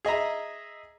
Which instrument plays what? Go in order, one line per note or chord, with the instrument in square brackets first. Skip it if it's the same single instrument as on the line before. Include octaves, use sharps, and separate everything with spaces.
[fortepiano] G#4 D#5 E5 A#5